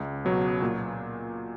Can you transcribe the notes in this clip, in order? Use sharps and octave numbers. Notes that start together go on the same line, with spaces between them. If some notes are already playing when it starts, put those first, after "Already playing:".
Already playing: C#2
B2 F#3 B3
A#2